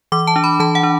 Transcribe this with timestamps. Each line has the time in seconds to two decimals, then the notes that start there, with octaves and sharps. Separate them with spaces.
0.12 E3 D6
0.27 A5
0.36 D4
0.44 B5
0.60 E3 A5
0.75 F#5
0.83 D4